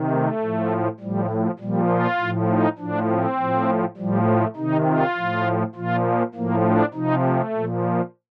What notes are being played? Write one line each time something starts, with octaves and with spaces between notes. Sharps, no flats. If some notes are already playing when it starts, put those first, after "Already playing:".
Already playing: C3 D#3
A3
A2 F3
A2 F3 G3
F3
A#2 F3 G3
F4
A2 F3
D#4
A2 F3 D4
C4
A2 F3
A2 F3 G3
A3
C3 D#3 D#4
F4
A2 F3
A#2 F3 F4
A2 F3 A#3
D4
C3 F3 D#4
A3
A#2 F3